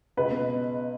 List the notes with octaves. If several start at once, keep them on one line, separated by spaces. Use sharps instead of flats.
C#2 B4
B2